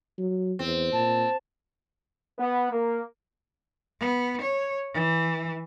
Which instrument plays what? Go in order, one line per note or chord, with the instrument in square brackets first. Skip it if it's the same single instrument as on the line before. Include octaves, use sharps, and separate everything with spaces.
[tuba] F#3
[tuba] E2 [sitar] C4
[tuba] A#2 [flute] A5
[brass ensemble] B3
A#3
[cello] B3
C#5
E3